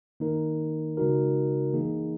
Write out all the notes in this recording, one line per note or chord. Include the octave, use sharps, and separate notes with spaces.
D#3 A#3 D#4 A#4
C#3 G#3 D#4 F#4 A#4
E3 A#3 D#4 G#4